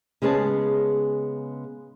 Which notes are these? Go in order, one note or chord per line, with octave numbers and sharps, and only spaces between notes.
C#3 G#3 B3 G#4 C#5 A5